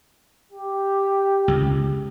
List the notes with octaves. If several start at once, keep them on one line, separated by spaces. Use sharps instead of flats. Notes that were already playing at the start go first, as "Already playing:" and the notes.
G4
C#2